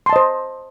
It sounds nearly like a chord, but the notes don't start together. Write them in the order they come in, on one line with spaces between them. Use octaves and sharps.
C6 A5 D#5 C5